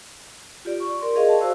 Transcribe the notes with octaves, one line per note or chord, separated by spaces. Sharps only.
F4 G4 D5
C#6
A#4 D5 C6
G#4 A#4 D#5 F5
A5
F#4 C5 F5 E6